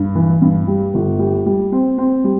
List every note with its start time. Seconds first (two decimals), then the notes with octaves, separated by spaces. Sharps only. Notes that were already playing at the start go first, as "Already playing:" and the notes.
Already playing: G2
0.15 E3
0.41 G2
0.67 G3
0.94 G1
1.19 G3
1.46 G3
1.72 C4
1.98 C4
2.24 G3